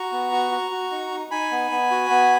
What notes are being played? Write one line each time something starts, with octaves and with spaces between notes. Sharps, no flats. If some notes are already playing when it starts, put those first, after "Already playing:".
Already playing: F#4 A#5 C#6
B3
F#4
F#4
F#4
D#4
D#4
D#4 G#5 B5
B3
B3
F#4
B3